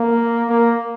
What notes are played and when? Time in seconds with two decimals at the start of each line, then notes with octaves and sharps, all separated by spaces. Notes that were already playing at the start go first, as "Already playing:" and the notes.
Already playing: A#3
0.50 A#3